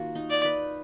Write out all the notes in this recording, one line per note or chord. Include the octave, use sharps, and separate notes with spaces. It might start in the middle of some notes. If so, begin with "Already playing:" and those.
Already playing: D#3 A#3 F4 F#4
D#4
D5
B4